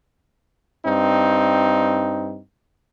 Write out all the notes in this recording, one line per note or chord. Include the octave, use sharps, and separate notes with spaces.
G2 C4 D#4